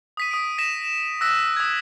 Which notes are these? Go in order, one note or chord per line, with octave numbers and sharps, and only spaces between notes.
D#6 B6 D#7
D#6 D7
A#6 B6 E7
E6 F#6 A#6 B6
D#6 G#6